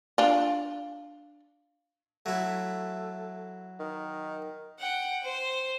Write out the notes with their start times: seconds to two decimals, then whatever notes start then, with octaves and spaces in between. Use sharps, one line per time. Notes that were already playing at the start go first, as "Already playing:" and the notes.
0.18 D4 F4
2.26 F#3 A3 E4
3.80 D#3
4.79 F#5 G5
5.23 C5